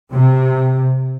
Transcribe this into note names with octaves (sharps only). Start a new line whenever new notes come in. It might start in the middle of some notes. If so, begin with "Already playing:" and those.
C3